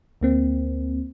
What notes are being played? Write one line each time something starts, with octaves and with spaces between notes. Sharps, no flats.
D2 A#3 C4